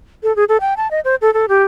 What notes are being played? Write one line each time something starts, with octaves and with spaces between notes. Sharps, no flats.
A4
G#4
A4
G5
A5
D#5
C5
A4
A4
G4